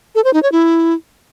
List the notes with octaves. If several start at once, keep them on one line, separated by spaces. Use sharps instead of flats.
A4
C5
D#4
C#5
E4